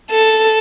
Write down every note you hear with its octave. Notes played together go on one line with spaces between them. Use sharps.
A4